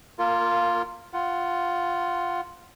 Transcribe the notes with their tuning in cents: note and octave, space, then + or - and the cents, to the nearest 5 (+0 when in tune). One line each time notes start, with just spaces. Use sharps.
A#3 +0 F4 +0 A#4 -30
F4 +0 F#5 +15